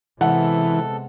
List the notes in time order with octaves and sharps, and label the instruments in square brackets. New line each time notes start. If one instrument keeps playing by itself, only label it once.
[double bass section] C3 G#3 B3 [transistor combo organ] E3 [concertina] A4 [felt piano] F#5